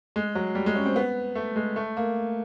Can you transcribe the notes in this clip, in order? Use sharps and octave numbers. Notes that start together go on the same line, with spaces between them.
G#3
F#3
G3
G#3
C#4
C4
B3
A3
G#3
A3
A#3